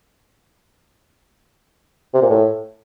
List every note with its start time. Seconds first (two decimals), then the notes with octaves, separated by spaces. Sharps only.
2.14 C3
2.22 A#2
2.30 A2